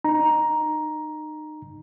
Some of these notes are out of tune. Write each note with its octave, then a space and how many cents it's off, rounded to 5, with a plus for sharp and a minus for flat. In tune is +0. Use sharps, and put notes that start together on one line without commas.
D#4 -30 A#5 +10